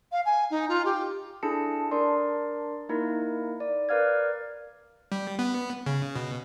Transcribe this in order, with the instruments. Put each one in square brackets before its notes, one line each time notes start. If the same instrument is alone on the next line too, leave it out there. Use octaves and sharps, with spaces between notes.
[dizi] F5
G#5
D#4
F4
G4
[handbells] D4 E4 G#4 A4 A5 C#7
D4 A#4 D5 C6
A#3 D#4 E4 A#4
D5
A#4 B4 D5 F5 F6 G#6
[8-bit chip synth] G3
B3
C#3
B2